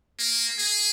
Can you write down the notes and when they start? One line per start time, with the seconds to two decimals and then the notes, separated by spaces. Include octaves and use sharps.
0.19 A#3
0.59 G#4